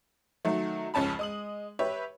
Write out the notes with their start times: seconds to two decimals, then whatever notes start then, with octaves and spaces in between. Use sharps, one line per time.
0.45 D#3 F#3 A3
0.94 F1 C#2 C#4 A5 B5
1.19 G#3 D#6 F#7
1.79 G4 B4 C#5 E5